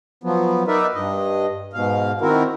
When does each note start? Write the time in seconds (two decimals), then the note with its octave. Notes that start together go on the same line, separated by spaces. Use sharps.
0.24 F3 F#3 B3
0.68 D#4 A#4 B4 D5 E5
0.95 G2 D#5
1.73 G#2 B2 F5
2.21 D#3 C4 E4 F#4 A#4